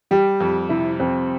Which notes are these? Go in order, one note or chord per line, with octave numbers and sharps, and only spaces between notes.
G3 G4
F2
C3 E4
F2 C4